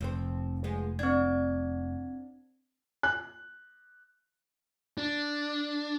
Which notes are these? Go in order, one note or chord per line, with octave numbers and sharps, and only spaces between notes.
F1 F3 C4 C5
F3 G#3 B3
C4 D4 G#6
F#6
D4